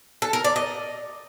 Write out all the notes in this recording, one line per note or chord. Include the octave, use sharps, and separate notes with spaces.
A4
A#4
D5
D#5